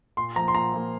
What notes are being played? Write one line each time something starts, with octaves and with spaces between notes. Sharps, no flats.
A#2 C6
F3 A#3 A#5
C6
A#2 A#5
F3 A#3